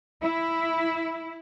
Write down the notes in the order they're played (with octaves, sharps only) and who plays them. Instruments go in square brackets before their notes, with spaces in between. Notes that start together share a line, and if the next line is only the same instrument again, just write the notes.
[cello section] E4